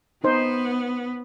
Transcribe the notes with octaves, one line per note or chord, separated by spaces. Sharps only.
B3 D#4 C5